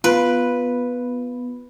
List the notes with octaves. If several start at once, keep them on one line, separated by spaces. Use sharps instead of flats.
B3 F4 B4